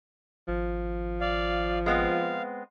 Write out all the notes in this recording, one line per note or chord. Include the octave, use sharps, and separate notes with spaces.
G#1 F3
D5 F5
G#3 B3 C4 F5